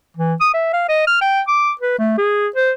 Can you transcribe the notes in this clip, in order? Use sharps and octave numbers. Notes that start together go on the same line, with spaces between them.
E3
D#6
E5
F5
D#5
F6
G5
D6
B4
A3
G#4
C5